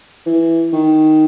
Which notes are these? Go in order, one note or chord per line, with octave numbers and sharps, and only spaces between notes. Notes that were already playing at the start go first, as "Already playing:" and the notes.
E3
D#3